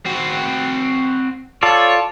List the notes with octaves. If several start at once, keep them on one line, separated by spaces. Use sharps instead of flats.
C4 F#4
F4 A4 C#5 D5